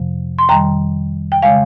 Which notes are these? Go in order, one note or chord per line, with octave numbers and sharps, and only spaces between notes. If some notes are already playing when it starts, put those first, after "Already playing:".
Already playing: F2 C3 F3
C6
F2 D#3 G3 G5 A#5
G5
C#3 G#3 F5 G#5